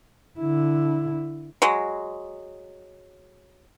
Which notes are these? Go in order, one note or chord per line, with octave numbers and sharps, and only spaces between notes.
D3 E4
F#3 G#3